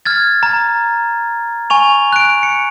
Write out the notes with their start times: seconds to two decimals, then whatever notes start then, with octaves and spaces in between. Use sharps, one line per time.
0.06 F6 G#6 A6
0.43 A#5
1.70 G#5 C#6 F7
2.12 F#6 D7
2.43 C#7